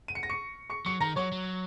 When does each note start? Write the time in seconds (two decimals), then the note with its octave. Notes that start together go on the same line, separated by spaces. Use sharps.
0.08 D#7
0.15 C#7
0.23 A#6
0.30 C#6 C#7
0.70 C#6 C#7
0.86 F#3 C#6 C#7
1.01 D#3 A#5 A#6
1.16 F#3 C#5 C#6
1.32 F#3